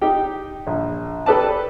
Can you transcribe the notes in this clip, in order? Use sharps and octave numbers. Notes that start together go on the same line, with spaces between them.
D#4 G4 G5
A#1
G4 A4 B4 D5 A5